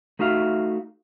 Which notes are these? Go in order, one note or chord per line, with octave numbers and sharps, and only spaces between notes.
A3 D#4 F#4 E5 F5